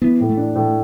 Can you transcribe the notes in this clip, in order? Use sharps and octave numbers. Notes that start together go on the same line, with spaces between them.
E3 B3
A2
A3
D4
A2